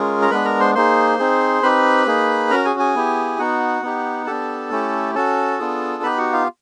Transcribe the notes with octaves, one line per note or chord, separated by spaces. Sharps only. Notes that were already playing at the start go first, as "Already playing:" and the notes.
Already playing: G#3 C#4 F4 G#4 A#4
A#5
G#3 B3 D4 B4 B5
A#4 A#5
C5 C6
A#3 D#4 G#4 C5 C6
C4 D#4 G#4
C4 D#4 G4 B4 B5
A#3 D#4 G#4
C#4 F#4 A#4 A#5
G#4 G#5
G#4 G#5
B3 E4 G4
B3 D#4 F#4 F#5
B3 D#4 G4
B3 D4 G4 A4 A5
A3 C#4 E4 G4
C#4 F#4 A4 A5
B3 D4 F4 G#4
B3 D#4 G4 B4 B5
F#4 F#5
F4 F5